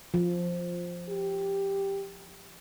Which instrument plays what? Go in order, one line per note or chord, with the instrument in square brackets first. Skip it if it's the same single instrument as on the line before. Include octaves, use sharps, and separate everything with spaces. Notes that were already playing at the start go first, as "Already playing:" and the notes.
[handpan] F3
[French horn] G4